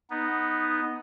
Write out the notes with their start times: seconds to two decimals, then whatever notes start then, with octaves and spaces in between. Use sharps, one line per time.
0.10 B3 D#4